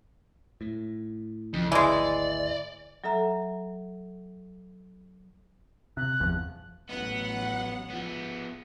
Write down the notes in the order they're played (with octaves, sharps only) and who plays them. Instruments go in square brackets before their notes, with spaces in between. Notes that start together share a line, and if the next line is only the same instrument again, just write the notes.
[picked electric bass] A2
[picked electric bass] B1 C#3 E3 [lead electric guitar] F2
[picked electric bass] G#1 D2 [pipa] E3 G#3 [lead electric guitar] D5
[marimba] F#3 A4 E5 A#5
[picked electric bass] C3 [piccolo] F#6
[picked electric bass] G1 E2 F3
[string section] A1 F#3 F#5 [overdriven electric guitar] B3
[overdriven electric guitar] F3 B3